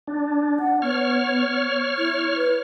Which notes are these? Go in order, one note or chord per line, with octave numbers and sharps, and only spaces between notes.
D4
F#5
B3 C#5 F6
E4
B4